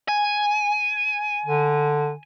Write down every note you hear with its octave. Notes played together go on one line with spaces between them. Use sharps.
G#5
D3